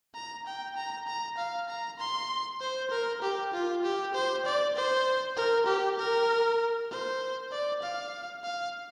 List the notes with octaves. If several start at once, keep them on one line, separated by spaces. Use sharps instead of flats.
A#5
G5
A#5
A#5
F5
A#5
C6
C5
A#4
G4
F4
G4
C5
D5
C5
A#4
G4
A#4
C5
D5
F5
F5